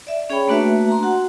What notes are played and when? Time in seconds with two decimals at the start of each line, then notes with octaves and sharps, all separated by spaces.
0.07 D5 E5
0.30 C#4 G#4 C#5 G5 B5
0.48 A3 A#3 D4 F#4 B4 E5
0.88 A#5 C6
1.03 F#4 F#5